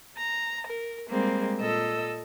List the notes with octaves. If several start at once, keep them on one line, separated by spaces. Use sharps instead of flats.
A#5
A#4
G3 G#3 A#3 C4
A#2 A4 D#5 E6